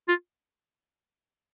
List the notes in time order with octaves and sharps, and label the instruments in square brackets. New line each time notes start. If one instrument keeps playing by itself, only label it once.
[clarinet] F4